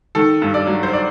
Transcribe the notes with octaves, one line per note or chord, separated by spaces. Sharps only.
D#3 A4
G2
D5
F#3
C5
D5